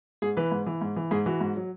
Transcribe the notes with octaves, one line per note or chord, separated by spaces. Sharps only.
G#2 G#4
E3 B4
G#2
E3
G#2
E3
G#2 G#4
E3 F#4
G#2
F#3